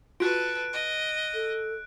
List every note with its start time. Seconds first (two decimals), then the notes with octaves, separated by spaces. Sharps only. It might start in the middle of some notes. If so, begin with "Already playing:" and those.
0.20 F4 F#4 A4 B4 F#6 D7
0.73 D#5
1.34 A4